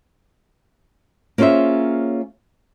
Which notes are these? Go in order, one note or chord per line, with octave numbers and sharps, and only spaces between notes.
A#3 C#4 F4 G#4 C5 E5